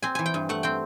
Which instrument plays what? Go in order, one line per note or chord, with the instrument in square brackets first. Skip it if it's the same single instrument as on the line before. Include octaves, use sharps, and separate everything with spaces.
[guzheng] C4 G#5
E3 G#5
G5
G2
A3 F#5
C4 G5